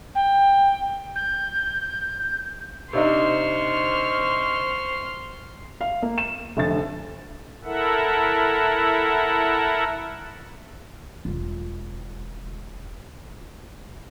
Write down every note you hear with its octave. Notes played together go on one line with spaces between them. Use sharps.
G5
G6
C3 D4 D#4 C5 C6 C#6 F6
F5
A#3
E7
F1 D3 A6
E4 A4 A#4 E5 F#5
E1 F4